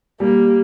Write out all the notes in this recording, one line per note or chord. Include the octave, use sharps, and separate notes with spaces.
G3 A#3